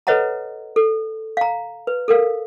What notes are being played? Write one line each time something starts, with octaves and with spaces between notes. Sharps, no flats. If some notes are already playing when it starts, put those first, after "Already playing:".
A4 B4 C#5 D#5 F#5 A#5
A4
F5 A#5
B4
A4 A#4 F5